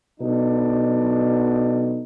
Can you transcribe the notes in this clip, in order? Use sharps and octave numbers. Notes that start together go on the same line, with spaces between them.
B2 F#3 D4 D#4 A4